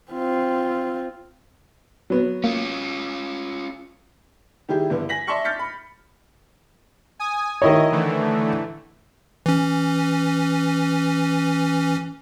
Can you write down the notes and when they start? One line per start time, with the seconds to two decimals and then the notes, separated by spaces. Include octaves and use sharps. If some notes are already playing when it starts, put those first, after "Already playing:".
0.12 C4 F4
2.10 F#3 B3
2.44 A#3 C#4 F4
4.69 D#3 G3 E4 G4 G#4
4.90 G2 D3 E3 B3 E4
5.09 G#5 A#6 B6 F#7
5.27 D5 E5 A5 C6 C#6 C#7
5.44 F6 G6 A6 B6 C#7
5.59 B5
7.19 G#5 D#6
7.62 D#3 E4 C#5 D#5
7.92 D3 E3 A3
9.46 E3 C#4